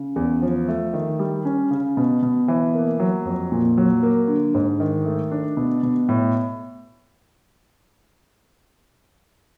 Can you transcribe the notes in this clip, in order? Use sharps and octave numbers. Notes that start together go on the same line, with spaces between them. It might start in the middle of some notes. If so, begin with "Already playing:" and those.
Already playing: C#3
E2
F3
A3
D#3
G3
C#4
C#3
B2
B2
E3
A#3
F#3
F2
A#2
F#3
A#3
D3
G#2
D#3
A3
D4
B2
B2
A2